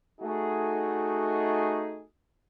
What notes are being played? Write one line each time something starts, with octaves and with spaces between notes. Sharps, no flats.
A3 D#4 F#4 G#4